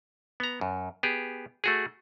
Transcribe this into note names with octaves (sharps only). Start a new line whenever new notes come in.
B3 A#5
F#2
B3 G4 G#4
A3 F#4 G#4